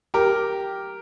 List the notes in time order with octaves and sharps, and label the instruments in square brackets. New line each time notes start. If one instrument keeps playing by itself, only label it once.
[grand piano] G4 A#4